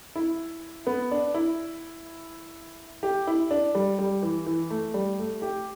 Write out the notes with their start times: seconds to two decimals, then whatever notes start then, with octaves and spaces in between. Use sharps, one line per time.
0.15 E4
0.87 B3
1.11 D4
1.34 E4
3.03 G4
3.27 E4
3.51 D4
3.75 G3
3.99 G3
4.22 E3
4.46 E3
4.70 A3
4.94 G3
5.19 A3
5.42 G4